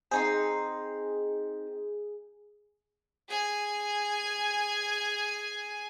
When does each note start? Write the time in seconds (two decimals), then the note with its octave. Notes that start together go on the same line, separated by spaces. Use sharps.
0.11 C4 D#4 G#4 C6
3.29 G#4 G#5